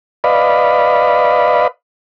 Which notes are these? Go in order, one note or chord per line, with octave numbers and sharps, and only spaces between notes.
B4 D5 D#5 F5 B5